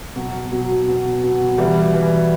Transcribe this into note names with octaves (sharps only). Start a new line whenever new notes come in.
B2 F#3
B2 F#3
B2
B2
F#3
E3 G3
E3